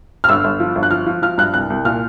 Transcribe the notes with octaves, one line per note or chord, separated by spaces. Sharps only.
F6
G1 E6
G1
F3
G1
F#6
F3 F6
F3
F3 F6
G2 F#6
C2 F#6
C2
A#2 F6